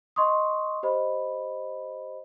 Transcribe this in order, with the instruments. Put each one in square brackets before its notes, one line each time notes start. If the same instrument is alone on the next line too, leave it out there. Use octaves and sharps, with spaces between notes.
[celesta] D#5 C6 C#6 D#6
G4 C5 D#5 B5